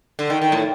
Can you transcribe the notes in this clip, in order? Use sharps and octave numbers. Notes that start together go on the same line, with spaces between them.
D3
D#3
D#3
A2